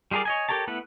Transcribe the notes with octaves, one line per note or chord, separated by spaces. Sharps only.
G3 F4 G#4 A#4 D5
C#5 D#5 G#5
G4 A4 A#4 C#5 A5
A3 B3 E4 B4 F#5